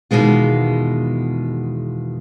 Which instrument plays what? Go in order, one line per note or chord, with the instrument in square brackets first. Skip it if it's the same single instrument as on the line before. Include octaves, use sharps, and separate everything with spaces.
[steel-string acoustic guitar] E2 B2 D#3 G#3 F4